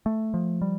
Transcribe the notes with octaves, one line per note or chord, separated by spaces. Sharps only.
A3
F3
G3